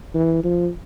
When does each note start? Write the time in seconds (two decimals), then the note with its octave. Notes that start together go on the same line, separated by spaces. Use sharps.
0.14 E3
0.44 F3